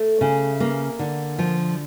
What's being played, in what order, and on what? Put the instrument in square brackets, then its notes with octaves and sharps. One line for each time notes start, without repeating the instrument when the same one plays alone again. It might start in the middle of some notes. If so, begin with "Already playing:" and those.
Already playing: [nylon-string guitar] A3
C#3
A#3
D3
F3